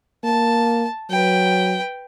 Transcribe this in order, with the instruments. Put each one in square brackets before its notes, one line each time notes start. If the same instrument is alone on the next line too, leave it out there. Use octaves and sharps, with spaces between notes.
[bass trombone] A#3 [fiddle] A5
[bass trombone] F#3 [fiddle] B4 G5